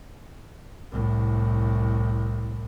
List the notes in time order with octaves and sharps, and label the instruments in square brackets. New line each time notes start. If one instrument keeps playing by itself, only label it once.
[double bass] C2 A2